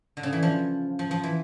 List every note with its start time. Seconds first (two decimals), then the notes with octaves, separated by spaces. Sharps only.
0.17 D3
0.23 C#3
0.33 E3
0.43 F3
0.99 F3
1.11 F3
1.23 E3